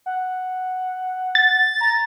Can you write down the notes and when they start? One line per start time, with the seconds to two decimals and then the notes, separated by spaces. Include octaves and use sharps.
0.06 F#5
1.35 A6
1.81 A#5